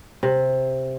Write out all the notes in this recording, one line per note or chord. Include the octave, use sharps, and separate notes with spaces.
C3